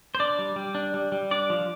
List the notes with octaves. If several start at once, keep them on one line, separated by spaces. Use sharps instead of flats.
C5
D4 D5
G3
G3
D4
G3
G3
D4 D5
F3